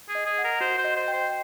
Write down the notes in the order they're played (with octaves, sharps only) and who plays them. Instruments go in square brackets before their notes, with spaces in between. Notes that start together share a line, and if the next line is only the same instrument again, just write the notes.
[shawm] G#4
[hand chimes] D#5
[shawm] G#4
[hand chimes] F#5
[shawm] A#4
[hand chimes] F#4 [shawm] C5
[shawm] C5
[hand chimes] D#5
[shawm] C5
[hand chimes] G5
[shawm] C5